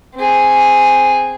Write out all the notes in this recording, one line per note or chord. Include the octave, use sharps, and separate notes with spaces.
C4 G#4